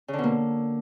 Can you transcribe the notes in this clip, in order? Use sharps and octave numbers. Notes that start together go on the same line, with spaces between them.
C#3
D3
B2
A#3